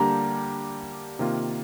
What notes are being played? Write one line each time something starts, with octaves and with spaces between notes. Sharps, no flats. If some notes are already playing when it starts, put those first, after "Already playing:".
Already playing: D3 G3 A#3 D4 G4 A#5
C3 D#3 A#3 F4